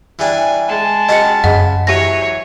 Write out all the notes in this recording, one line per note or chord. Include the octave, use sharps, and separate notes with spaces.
E3 G3 D4 G#5
G#3 A5
F#3 C#4 G4 D#5 C#7
F#2 C#3 D#5 F#5
E3 F#3 G4 C#5 A#6